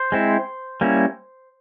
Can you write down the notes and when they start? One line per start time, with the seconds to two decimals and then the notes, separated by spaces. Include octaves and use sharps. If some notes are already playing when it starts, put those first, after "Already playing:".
Already playing: C5
0.12 G#3 C4 E4
0.81 G3 A#3 C#4 E4